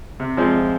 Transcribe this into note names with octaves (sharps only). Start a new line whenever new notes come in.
C3
F3 G#3 C4